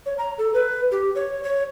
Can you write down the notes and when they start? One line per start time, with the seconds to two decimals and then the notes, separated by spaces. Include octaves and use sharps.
0.06 C#5
0.18 A#5
0.38 A4
0.54 B4
0.92 G4
1.15 C#5
1.44 C#5